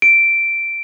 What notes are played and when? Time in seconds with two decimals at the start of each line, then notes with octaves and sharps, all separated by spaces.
0.02 D7